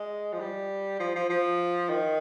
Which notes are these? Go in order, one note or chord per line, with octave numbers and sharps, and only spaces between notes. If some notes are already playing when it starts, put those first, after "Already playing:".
Already playing: G#3
F3
G3
F3
F3
F3
D#3